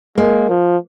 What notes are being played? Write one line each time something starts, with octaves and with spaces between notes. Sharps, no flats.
G#3 A#3
F3